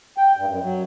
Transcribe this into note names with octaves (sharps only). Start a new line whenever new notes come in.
G5
G2
F#2
F#3